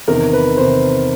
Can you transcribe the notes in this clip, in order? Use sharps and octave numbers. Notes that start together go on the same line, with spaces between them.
E2 C3 D#3 A#4
B4
E2 C3 D#3 C5